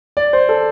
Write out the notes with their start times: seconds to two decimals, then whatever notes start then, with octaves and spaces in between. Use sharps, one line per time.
0.17 D5
0.33 C5
0.49 A4